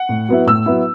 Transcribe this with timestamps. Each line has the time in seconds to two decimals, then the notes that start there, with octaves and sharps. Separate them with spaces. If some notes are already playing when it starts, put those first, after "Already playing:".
Already playing: F#5
0.09 A2
0.28 F#3 B3 E4
0.46 A2 E6
0.66 F#3 B3 E4